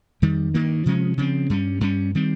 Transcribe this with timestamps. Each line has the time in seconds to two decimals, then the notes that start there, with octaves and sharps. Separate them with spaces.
0.22 F2 D#3 G3
0.54 G2 D#3 A#3
0.86 C3 F3 G#3 C#4
1.17 C#3 F3 C4
1.50 G2 G3 C#4
1.81 G2 G3 C#4
2.15 D#3 G3 C4